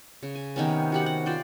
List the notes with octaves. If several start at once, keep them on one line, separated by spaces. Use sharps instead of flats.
C#3
G#5
C3 D#3 B3 C#4
F#4 G4 F#5
F#5
F4 C5 D5 G5